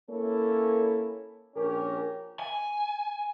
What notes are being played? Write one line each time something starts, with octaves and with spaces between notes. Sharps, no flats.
A#3 C#4 E4 A4 C#5
A#1 C#4 G4 A#4
G#5